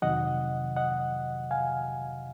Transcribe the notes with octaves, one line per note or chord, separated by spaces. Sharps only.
F2 C3 D#3 F#3 D#5 F#5
D#5 F#5
F5 G#5